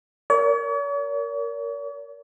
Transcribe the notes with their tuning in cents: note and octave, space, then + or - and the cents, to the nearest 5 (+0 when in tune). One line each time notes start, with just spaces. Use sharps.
A#4 +0 C#5 +45